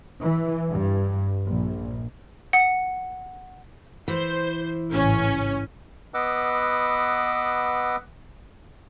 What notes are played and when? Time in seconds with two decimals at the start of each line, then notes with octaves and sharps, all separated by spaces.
0.21 E3
0.69 G2
1.47 A#1
2.53 F#5
4.08 E3 C5
4.92 A1 G#2 C#3 C#4
6.14 B3 B4 D#5 F#5 D6 E6